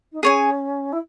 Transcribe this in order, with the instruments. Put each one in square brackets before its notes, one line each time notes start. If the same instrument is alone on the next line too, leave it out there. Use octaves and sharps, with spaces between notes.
[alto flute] D#4
[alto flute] C#4 [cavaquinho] G#4 C#5 G#5
[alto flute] E4